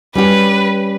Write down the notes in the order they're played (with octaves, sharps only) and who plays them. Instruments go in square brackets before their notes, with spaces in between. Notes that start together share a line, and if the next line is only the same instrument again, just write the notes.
[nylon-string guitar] G3 C#4 G4 [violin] B4